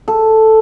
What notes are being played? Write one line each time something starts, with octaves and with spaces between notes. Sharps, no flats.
A4